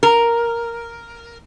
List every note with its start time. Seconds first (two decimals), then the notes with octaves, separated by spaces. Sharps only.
0.03 A#4